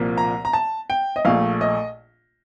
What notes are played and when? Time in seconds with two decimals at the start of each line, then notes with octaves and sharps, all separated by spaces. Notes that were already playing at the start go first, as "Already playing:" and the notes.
Already playing: C2 A#2 F3 A#3
0.18 A#5
0.45 A#5
0.53 A5
0.90 G5
1.16 D#5
1.25 A#1 A#2 A3 F5
1.61 D#5